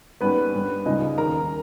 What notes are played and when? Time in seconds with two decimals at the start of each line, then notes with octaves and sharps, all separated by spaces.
0.21 G#2 G3 A#3 B3 C#4 B4
0.54 G2 G3 B3
0.86 C#2 C#3 G3 D#4 D#5
1.18 D#2 D#3 A#3 C#4 A#4 A#5